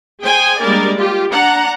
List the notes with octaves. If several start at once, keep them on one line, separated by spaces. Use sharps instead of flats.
G#4 C5 G5 G#5
G3 G#3 A#3 D4 A#4 D5
F4 G4
D4 F#5 A#5